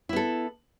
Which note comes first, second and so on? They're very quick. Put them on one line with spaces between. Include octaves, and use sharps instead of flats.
E4 B3 A4